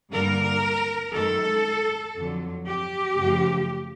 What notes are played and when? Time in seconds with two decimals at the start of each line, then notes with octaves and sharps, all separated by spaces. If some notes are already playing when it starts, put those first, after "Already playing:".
0.12 G2 D3 G3 A#3 A#4
1.13 F#2 D#3 G#3 A4
2.15 F2 D3 F#3
2.66 G4
3.17 F#2 C#3 F3 A3